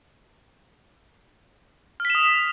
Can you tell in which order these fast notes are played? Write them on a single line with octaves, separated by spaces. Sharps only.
F6 B6 E7 D#6